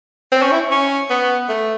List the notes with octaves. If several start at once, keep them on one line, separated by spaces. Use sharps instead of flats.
C4
C#4
E4
C#4
B3
A3